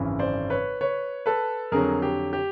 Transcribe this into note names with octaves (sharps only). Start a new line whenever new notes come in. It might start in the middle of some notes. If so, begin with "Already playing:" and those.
Already playing: G#1 F#2 C#3 E3
C5 D5
B4 C#5
B4 C#5
A4 B4
F2 D3 F#3 G#4 A#4
G4
G4